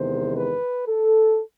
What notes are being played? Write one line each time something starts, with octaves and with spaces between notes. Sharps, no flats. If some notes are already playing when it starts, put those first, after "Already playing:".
Already playing: E2 C3 D#3 G#3 B3 C5
B4
A4